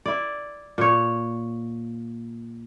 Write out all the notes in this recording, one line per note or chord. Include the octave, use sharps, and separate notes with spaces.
E4 D5
A#2 C#5